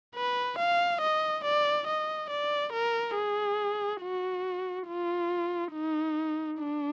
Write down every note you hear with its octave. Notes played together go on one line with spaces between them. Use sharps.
B4
F5
D#5
D5
D#5
D5
A#4
G#4
F#4
F4
D#4
D4